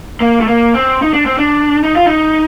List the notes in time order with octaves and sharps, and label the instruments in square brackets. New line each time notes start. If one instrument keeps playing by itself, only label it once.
[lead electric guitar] A#3
A3
A#3
C4
D#4
D4
C4
D4
D#4
F4
D#4